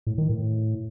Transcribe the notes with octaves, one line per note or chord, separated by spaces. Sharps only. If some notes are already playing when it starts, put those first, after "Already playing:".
A2
D#3
A2